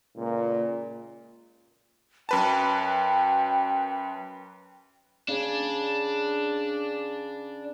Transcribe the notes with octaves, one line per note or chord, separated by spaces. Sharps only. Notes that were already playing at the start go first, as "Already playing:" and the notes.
C#2 A#2
F#2 B4 G5 A5
C#3 D4